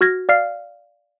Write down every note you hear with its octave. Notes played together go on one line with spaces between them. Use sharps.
F#4 F6 G#6 A#6
D5 F5 F6 C7